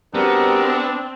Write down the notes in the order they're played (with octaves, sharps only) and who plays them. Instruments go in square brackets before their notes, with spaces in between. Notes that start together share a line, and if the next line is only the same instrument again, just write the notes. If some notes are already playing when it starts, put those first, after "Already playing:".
[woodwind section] G3 F#4 A#4 [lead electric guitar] B3 [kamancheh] C4 [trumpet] D4